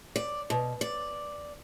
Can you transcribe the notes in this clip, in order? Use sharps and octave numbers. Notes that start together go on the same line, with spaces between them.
D5
B2
D5